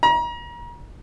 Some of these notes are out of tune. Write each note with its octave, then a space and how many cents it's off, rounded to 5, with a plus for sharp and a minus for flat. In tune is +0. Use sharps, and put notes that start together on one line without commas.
A#5 +35